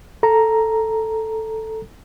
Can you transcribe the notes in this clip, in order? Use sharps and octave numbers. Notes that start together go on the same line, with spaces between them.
A4 A#5